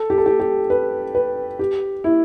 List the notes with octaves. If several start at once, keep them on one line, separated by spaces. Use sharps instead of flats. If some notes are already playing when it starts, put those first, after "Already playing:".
Already playing: A4
G4
A4
G4
G4
B4
B4
G4
E4